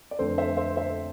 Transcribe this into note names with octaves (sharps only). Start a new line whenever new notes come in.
D5
F2 D3 A3 A4 C5
C5 E5
C5 E5
C5 E5